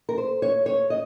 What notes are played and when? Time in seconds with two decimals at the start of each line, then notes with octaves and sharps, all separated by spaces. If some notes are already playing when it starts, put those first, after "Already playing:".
0.09 A#4
0.18 C5
0.42 C#5
0.66 C#5
0.90 D#5